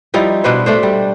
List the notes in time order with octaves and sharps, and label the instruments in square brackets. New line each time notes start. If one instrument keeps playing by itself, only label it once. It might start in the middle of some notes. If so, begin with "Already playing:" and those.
[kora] F3 G3 D#4 E4
B2 D4 B4 C5
A3 D4 C5
G3